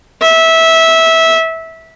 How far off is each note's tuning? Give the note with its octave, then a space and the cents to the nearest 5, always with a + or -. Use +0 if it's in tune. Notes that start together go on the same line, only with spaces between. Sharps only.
E5 -20